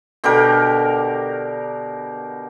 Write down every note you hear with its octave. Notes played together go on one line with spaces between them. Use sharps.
B2 D3 G4 A#4